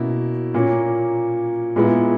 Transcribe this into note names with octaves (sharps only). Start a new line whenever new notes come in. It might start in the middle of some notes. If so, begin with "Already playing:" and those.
Already playing: B2 A#3 C#4 E4
A#2 A#3 C#4
A#2 G#3 B3 E4